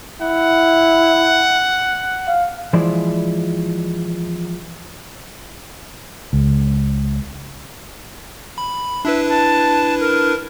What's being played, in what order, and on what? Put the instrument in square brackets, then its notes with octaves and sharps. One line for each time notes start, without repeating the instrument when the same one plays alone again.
[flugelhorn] E4 [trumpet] F#5
[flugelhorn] F5
[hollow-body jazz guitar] E3 F3 G#3 E4 C5 D5
[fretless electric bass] C#2
[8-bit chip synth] B5
[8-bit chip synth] D4 E4 B4 [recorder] E5
[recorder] A5
A#4